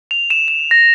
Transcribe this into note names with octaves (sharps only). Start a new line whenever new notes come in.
F7
E7
E7
A#6